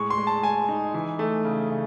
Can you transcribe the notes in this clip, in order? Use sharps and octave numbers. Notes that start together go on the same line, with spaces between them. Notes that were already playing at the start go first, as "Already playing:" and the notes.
Already playing: A2 G#3 C#6
C6
G#3
A5
G#3 G#5
D#4
E3
A3
C#3
C#3